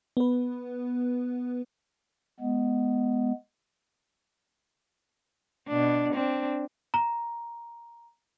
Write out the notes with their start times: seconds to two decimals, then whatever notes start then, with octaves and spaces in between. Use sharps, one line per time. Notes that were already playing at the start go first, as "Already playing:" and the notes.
0.17 B3 B4
2.40 G#3 B3
5.67 B2 D4
6.13 C4 D4
6.94 A#5